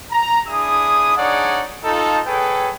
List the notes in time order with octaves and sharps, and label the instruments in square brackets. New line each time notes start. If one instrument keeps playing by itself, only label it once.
[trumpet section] A#5
D4 E4 G#4 D#6
D4 D#4 G#4 C#5 D5 F#5
D#4 F4 A4
G#4 A4 B4 C#5 G5